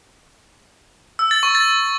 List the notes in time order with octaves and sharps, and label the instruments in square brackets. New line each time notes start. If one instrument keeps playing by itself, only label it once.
[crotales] E6
A6
C#6
A6